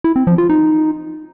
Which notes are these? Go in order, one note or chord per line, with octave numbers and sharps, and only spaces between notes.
E4
C4
F3
F4
D#4